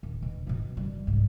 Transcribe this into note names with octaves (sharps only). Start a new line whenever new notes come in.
D#1
B2
B2 C4
F#1 G3
C2 G#2